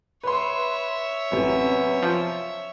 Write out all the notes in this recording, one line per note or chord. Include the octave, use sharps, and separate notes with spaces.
B4 C#5 E5 C6
A1 F#2 C3 B3
F3